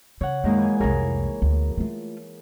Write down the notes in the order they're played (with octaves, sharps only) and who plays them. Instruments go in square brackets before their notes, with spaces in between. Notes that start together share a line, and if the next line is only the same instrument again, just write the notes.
[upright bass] C#3 [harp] C#5 F#5
[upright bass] F#2 [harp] D#3 G#3 A#3
[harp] E3 G#5
[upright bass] C2 F2 [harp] G#4 A#4 C#5
[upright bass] D2
A3 F4